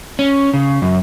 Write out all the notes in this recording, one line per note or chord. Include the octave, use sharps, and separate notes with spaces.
C#4
C#3
F#2